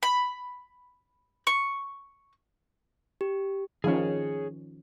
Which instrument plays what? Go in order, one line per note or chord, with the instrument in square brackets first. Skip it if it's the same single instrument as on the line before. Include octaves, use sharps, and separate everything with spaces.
[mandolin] B5
C#6
[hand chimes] G4
[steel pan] D#3 F3 C#4 [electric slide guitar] G#4 C#5